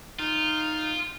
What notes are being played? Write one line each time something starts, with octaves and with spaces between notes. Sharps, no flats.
D#4 F4